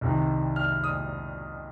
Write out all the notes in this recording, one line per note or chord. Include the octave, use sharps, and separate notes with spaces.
C2 C3 D#3
F6
D#6